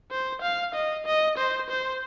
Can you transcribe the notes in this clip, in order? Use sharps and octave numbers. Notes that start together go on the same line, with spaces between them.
C5
F5
D#5
D#5
C5
C5